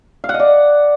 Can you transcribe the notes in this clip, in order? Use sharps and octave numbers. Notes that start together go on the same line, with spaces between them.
F5
F#5
D#5
D5